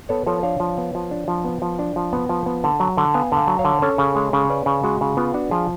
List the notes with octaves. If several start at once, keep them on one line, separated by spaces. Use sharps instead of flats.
B3 A4 C#5
F3 A4 C#5
D4 C#5 F5
F3
B3
F3
D4
F3
B3
F3
D4
F3
B3
F3
B3
D3
F#3
D3
B3 F5 G#5
D3 F5 G#5
F#3
C#5 F5
D3
C#4 A4 C#5
C#3
G#3
C#3
C#4 B4 D5
C#3
G#3 F#4
C#3
B3 F4
D4 F#4
F3 F4 G#4